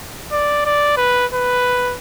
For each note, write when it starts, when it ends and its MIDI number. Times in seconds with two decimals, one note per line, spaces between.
0.32 0.65 74
0.65 0.96 74
0.96 1.26 71
1.33 1.96 71